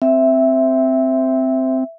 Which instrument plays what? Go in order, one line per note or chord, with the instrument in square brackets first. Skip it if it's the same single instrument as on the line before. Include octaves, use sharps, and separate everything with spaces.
[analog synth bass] C4 [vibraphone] E5